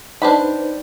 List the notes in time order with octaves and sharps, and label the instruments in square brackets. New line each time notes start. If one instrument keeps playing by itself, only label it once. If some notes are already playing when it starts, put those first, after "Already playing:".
[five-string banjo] D4 G4 B5 [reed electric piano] D#4 B4 C5